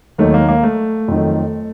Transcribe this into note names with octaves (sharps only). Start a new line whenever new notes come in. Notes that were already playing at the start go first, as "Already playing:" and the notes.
D#2 D#3 F#3 A3
A#3
A#3
A3
F2 D#3 F#3